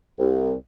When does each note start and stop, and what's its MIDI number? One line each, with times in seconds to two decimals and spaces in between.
0.19 0.52 36